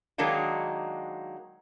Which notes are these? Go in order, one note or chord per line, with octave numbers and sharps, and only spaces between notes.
D#3 F#3 G#3 A#3 D4 D#4